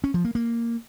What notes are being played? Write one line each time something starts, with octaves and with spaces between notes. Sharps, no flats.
C#4
F3
A#3
A#3